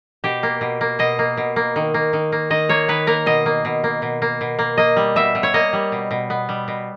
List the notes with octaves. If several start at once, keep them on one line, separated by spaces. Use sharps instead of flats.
B2 G4
A#3
B2
A#3
B2 D#5
A#3
B2
A#3
D#3
A#3
D#3
A#3
D#3 D#5
A#3 C#5
D#3 B4
A#3 A#4
B2 D#5
A#3
B2
A#3
B2
A#3
B2
A#3
A#3 D#5
G3
B2 E5
B2
C#5
A#3 D#5
G3
B2
B2
B3
G3
B2